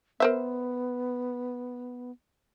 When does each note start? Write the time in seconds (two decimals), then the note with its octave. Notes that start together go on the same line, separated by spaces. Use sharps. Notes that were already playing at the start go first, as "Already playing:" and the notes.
0.20 B3 A#4 C5 E5